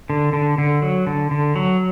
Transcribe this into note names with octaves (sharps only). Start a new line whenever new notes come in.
D3
D3
D3
F#3
D3
D3
F#3